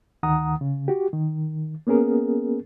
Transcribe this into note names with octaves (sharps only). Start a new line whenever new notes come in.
D2 D#3 F#5 A#5 D#6
C#3
F#4 G4
D#3
A#3 B3 C#4 G#4 A#4